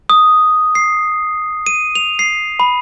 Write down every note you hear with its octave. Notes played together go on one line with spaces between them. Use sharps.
D#6
C7
D#7
F7
C7
B5